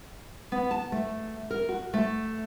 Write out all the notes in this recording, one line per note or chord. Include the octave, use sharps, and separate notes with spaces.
B3
A5
A3
A#4
F#4
A3